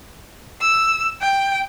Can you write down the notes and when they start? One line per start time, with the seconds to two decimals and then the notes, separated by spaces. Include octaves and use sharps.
0.61 E6
1.21 G5